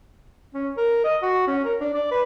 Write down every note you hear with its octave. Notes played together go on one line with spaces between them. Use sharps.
C#4
A#4
D#5
F#4
C#4
A#4
D4
D5
B4